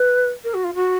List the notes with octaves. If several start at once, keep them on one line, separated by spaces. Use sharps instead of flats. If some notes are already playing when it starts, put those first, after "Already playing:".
Already playing: B4
A#4
F#4
F4
F#4